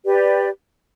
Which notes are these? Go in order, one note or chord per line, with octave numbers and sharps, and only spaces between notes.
G4 B4 D5